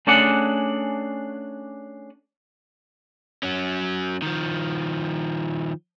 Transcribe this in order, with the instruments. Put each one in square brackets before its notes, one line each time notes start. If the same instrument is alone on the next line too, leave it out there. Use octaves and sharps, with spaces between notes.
[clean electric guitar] A3 C#4 D4 G#4 D5 F#5
[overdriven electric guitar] F#3 C#4
D#3 F3